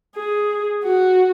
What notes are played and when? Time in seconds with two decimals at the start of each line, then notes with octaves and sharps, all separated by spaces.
0.16 G#4
0.84 F#4